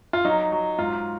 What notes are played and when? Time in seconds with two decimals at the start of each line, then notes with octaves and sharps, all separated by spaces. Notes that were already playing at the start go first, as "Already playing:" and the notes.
0.13 F4
0.25 F#3 D#4
0.52 F#3
0.79 G#2 F4